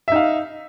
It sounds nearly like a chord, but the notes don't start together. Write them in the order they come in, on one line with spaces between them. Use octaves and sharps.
E5 D#4 F5